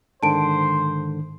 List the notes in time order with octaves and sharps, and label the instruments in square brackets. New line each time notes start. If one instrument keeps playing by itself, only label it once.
[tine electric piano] G#2 D3 D#3 [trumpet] C5 [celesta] A5 D7